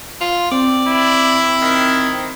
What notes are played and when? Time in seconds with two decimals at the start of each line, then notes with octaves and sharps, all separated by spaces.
0.21 F4
0.51 C4 D5
0.88 E4
1.61 D#3